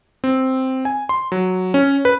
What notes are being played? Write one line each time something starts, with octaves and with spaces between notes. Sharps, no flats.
C4
G#5
C6
F#3
C#4
B4